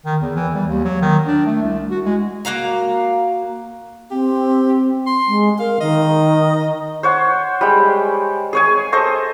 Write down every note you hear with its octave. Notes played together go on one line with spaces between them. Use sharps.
D#3
E2
E3
G3
D#2
F#3
D#3
D4
A3
C2
F#4
G#3
A#3 F#4 F5 A#5
C4 G4
C6
G#3
A#4 F5
D#3 D#5
C5 C#5 F#5
G3 G#3 G5
G#4 C#5 G#5
A4 C5 D#5 C#6